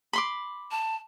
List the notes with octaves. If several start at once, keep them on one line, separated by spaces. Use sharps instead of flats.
B5 C6 D6
A5